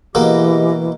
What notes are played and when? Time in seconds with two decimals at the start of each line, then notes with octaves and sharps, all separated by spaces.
0.15 B2 E3 G#3 A#3 G4 D#5